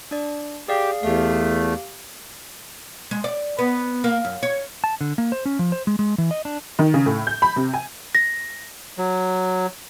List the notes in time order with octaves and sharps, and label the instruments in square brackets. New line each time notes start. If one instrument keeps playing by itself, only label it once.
[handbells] D4 D5
[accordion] G4 [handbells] G#4 D5 F5
[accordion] E2 A3 [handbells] G4 F5
[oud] G#3
D5
B3
A#3
F#2
C#5
[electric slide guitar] A5
D3
A#3
C5
C#4
F3
C5
G#3
G#3
E3
D#5
D4
[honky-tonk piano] D#3
C#3
A2
G6
B5
C3
G#5
[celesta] A#6
[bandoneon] F#3